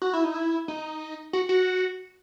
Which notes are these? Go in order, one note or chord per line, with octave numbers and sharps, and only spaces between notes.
F#4
E4
D#4
E4
D#4
F#4
F#4